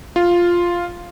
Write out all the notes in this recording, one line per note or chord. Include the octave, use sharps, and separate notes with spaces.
F4